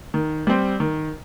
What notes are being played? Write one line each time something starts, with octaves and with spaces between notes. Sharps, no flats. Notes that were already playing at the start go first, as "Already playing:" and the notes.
D#3
G3 C4
D#3